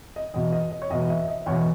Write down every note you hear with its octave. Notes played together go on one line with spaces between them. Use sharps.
D#5
E2 B2 D#5
D#5
D#5
C#5
E2 B2 D#5
E5
D#5
E2 B2 C#5